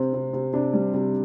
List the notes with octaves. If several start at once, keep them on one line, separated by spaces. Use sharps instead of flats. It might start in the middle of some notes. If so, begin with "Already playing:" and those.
Already playing: C3 C4
C3
C3
C3 D4
G3
C3